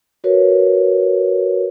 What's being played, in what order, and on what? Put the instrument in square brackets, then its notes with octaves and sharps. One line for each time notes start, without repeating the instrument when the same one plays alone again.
[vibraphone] F#4 A#4 B4 C#5